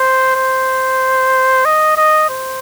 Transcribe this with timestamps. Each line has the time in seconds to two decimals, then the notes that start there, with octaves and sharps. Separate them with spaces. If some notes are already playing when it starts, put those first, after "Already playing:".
Already playing: C5
0.36 C5
1.65 D#5
1.97 D#5
2.30 C5